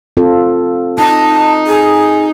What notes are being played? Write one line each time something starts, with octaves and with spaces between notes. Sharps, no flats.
C4 F4 A4
D#4 D#5 A5
G#4